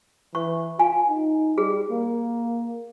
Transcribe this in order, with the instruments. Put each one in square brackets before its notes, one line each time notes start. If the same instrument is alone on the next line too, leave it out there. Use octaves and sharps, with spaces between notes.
[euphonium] E3 [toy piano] C#6
[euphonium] F4 [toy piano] G#5
[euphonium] D#4
[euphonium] G3 [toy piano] G#4
[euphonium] A#3